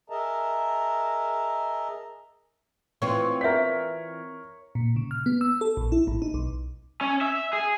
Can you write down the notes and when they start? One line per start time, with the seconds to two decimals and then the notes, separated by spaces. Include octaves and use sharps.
0.10 G#4 A#4 D#5 E5 A5 A#5
3.02 E3 C4 F4 C#5
3.41 A#4 D5 E5 G6 B6
4.75 A#2
4.96 C#3
5.11 F6
5.26 B3
5.41 E6
5.61 A4
5.77 A#1
5.92 E4
6.07 G#1
6.22 D#4
6.34 B1
7.01 C#4
7.21 E5
7.53 G#4